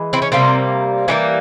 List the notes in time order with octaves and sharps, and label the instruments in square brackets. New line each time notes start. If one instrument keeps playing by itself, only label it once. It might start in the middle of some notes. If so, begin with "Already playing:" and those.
Already playing: [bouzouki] E3 G#3
C4 E4
C#4
C3 G3 A#3 C4
E3 G3 A#3 C#4